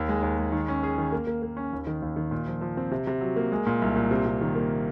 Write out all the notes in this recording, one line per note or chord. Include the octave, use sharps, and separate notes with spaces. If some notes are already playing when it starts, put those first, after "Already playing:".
Already playing: D#2
G#3
D#2
G#3
D#3
C#4
G#4
D#3
A#3
A#3
A#3
C#4
D#2
D#3
D#2
D#3
A#2
F3
F3
C4
C3
C3
F#3
A#3
G#3
A#2
C2
A#2
C3
C3
D#3
A#3